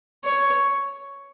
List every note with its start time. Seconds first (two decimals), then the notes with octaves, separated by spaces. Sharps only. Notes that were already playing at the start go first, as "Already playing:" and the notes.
0.25 C#5